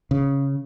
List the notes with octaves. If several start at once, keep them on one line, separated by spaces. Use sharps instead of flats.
C#3